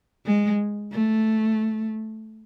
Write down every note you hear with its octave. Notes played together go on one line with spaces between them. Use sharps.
G#3
A3